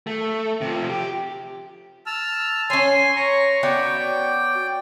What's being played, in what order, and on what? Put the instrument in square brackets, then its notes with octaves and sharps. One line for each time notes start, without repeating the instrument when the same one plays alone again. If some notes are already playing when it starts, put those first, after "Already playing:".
[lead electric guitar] A3
C3 F3
G4
[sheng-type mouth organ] A5 E6 F6
[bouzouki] C#4 C#5 [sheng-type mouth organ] G#5 C6
[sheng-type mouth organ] A#5 C#6
[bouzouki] B3 C#4 F#4 [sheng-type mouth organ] D5 G5